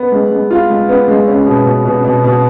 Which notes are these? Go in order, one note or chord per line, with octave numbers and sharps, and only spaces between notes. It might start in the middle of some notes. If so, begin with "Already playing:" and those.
Already playing: B3
G#3
G#3
F4
G#3
B3
G#3
C#4
B2
B2
B2
B2
B2